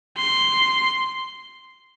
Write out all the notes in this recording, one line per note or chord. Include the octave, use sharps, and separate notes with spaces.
C6